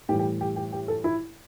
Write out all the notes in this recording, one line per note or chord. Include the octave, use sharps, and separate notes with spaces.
A2 E3 G3 G4
G4
G4
G4
G4
A4
E4